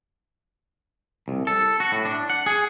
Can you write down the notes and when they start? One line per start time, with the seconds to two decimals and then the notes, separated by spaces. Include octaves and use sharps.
1.28 C2
1.47 A4
1.80 F#4
1.92 A2
2.05 D4
2.30 F#5
2.46 G#4